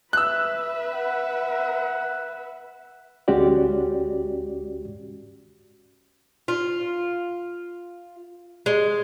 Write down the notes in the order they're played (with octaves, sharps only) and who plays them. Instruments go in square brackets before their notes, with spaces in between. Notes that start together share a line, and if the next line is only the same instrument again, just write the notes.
[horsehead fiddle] B4 E5 [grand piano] E6 F#6
[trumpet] F#5
[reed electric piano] D2 G#3 C#4 F#4 G4 D5
[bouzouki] F4
G#3